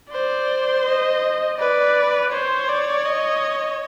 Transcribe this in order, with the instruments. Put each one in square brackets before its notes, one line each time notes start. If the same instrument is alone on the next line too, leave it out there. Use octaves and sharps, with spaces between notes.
[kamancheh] C5 [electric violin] D5
[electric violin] D#5
[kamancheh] B4 [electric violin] D5
[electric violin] C5 [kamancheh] C#5
[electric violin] D5
D#5